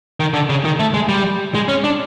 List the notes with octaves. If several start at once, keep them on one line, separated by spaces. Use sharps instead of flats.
D#3
D3
C#3
D#3
A3
G#3
G3
G#3
C#4
D4